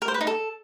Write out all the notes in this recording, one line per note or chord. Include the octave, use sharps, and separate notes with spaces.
A#4
C5
B4
D#4
A4